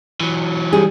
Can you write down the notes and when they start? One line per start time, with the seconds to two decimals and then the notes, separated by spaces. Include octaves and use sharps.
0.20 E3 F#3
0.73 G3 G#4